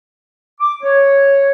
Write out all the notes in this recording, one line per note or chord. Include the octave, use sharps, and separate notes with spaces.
D6
C#5